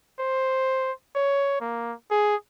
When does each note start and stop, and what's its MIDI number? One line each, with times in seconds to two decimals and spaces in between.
0.19 0.92 72
1.15 1.57 73
1.61 1.93 58
2.11 2.36 68